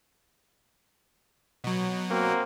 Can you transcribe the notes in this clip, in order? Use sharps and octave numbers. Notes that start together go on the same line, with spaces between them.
B2 F#3
A#3 C4 F#4